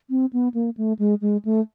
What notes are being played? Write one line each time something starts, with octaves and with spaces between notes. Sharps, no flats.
C4
B3
A#3
A3
G#3
G#3
A3